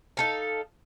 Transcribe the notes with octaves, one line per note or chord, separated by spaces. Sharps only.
D#4 A4 F5